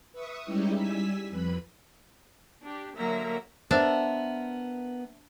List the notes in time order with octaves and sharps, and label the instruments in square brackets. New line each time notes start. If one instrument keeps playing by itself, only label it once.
[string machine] B4 E5 C#6 D#6
G3 G#3 C#4 D#4 E4 G4
G3 G#5 E6 B6
F2 B4 B5
[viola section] D4 G4
D3 F#3 A#3 A#4 E5 A#5
[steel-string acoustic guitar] B3 A#4 [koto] D4 A5 [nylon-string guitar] C5 E5